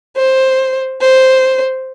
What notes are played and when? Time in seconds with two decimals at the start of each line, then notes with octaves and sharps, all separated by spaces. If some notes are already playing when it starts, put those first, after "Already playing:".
0.17 C5
1.01 C5